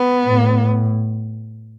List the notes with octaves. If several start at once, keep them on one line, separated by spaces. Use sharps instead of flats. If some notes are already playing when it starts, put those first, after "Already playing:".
Already playing: B3
A2